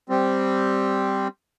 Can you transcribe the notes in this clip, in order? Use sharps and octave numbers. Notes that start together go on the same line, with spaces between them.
G3 C4